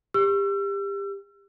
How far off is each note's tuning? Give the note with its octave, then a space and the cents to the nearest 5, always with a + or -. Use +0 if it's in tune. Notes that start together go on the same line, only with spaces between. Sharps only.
G4 +25 E6 +40